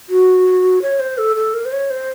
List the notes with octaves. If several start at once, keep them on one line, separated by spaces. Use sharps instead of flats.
F#4
C#5
C5
A4
A4
A#4
C5
C#5
C5